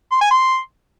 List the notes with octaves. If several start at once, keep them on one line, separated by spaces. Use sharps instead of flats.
C6
G#5
C6